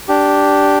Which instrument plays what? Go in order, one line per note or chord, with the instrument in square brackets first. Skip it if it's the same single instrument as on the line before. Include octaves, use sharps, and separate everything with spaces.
[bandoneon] D4 G4